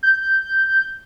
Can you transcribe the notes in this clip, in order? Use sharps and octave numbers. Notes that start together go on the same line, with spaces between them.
G6